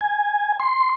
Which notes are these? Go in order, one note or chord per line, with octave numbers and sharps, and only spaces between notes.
G#5
C6